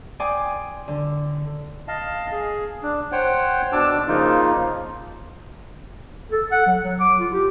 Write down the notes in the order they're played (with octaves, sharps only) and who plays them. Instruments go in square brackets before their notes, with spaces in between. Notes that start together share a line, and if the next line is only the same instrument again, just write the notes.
[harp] D5 G5 G#5 C6 D#6
D3
[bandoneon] D#5 F5 A5
G#4
D4
C5 C#5 F#5 G5
B2 D4 A5 D6 E6
C#3 F3 A#3 D#4 F4
[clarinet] A4
F#5
F#3
F#3
D6
F4
G4